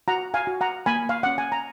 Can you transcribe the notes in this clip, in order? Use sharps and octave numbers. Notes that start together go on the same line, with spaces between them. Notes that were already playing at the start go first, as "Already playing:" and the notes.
F#4 F#5 A#5
F5 G#5
F#4
F#5 A#5
A#3 G#5 B5
F5
C#4 F#5
G#5
A#5